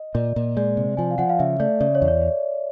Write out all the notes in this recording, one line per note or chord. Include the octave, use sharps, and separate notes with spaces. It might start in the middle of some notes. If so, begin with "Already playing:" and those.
Already playing: D#5
A#2 D5
A#2
G#3 D5
C3
F3 G#5
F5
F3 F#5
F5
C#3 E5
A3 D5
C#3 D5
C#5
E2
D5